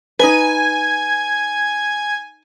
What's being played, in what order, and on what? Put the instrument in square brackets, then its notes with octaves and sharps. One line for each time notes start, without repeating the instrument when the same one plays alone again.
[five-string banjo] D#4 B4 [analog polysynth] G#5